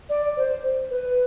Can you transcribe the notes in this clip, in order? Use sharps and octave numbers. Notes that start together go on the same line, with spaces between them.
D5
C5
B4